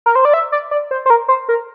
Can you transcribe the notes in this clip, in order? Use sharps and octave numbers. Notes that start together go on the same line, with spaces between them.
A#4
C5
D5
E5
D5
D5
C5
C5
A#4
C5
A#4